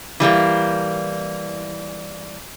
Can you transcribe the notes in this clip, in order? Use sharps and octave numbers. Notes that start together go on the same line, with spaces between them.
E3 G3 A3 A#3